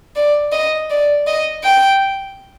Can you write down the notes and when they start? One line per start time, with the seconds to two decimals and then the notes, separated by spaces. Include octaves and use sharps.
0.16 D5
0.52 D#5
0.90 D5
1.27 D#5
1.64 G5